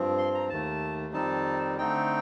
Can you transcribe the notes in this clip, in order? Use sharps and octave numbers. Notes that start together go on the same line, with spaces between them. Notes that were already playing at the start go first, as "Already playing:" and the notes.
Already playing: G2 F3 C4
C6
A#5
D#2 D#3 A3 A5
F2 D#3 G3 C4 D#4 A5
D3 A3 C4 D#4 G5